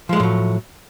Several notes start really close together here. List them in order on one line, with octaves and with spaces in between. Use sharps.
F3 G#3 A3 A2 F#3